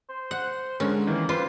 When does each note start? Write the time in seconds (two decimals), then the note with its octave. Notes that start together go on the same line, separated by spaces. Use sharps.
0.10 C5
0.31 F#5
0.80 D3 G#3 C#4 A#4
1.07 D#3 E3 A#3
1.29 G3 F4 B4 C5